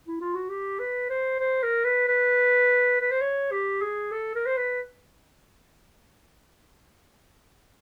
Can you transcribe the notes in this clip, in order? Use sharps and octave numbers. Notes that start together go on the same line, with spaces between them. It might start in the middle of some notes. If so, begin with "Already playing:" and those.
E4
F4
F#4
G4
B4
C5
C5
A#4
B4
B4
B4
C5
C#5
G4
G#4
A4
A#4
C5
B4